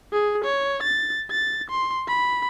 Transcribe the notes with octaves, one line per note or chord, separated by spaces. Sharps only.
G#4
C#5
A6
A6
C6
B5